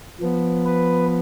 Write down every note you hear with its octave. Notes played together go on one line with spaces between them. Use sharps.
F3 B3
B4